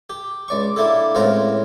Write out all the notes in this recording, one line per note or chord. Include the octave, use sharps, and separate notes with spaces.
G4
C#2 D5 C#6
A#3 D4 E4 G4 A4
C#2 A2 C4 F4 A#4 F5